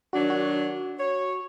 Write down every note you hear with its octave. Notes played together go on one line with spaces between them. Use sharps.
D#3 F#3 D4 F#4
F#4
C#5